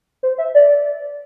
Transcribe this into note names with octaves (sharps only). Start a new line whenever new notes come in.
C5
E5
D5